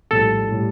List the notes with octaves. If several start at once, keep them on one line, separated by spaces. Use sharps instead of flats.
A#1 A2 G3 A4
A2 G3